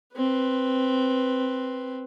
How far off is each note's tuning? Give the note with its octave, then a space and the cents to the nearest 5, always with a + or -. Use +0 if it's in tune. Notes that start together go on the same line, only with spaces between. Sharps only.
C4 +0 B4 +0